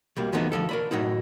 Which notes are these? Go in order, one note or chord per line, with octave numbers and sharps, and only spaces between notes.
B1 G3 A#3
E2 E3 F3 A3 B3 D#4
D2 G2 F3 A4
A#4 D5 B5
A2 F#3 D#4 E4